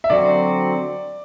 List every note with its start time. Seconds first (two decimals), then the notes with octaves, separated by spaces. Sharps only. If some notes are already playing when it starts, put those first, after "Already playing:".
0.04 E5
0.10 D3 F#3 C4 F#4 D5